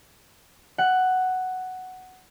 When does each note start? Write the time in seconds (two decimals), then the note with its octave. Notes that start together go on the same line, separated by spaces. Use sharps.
0.78 F#5